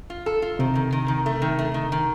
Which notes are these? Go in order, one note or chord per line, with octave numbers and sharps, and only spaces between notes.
F4
A4
F4
C3 D#3
D#3
D#3
D#3
A3
D#3
A3
D#3
D#3